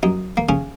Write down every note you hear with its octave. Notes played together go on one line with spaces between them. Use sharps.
F#2 D#4
A#3
C#3 C#4